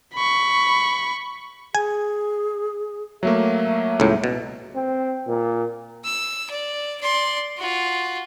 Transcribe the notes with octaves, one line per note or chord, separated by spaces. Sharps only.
B5 C#6
G#4 G#5
F#3 A3 A#3 E5
C#2 A2
B2
C4
A#2
E6
D5
D5 C6
F4 F#4